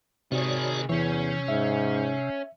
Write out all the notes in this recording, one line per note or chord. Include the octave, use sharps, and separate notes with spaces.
C3 D#3 F#4 G#4 C#5 D5
E2 C3 E3 C#4 C#5
G#2 E5